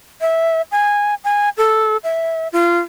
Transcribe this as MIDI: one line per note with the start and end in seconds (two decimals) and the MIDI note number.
0.21 0.62 76
0.72 1.14 80
1.24 1.49 80
1.57 1.97 69
2.04 2.48 76
2.52 2.78 65